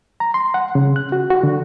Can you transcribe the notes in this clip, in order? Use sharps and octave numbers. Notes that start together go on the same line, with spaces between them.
A#5
C6
F#5
C#3
F#6
F#4
F#4
D3